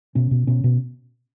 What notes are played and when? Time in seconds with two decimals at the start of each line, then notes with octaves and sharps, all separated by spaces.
0.15 B2 C#4
0.31 B2
0.47 B2 C#4
0.64 B2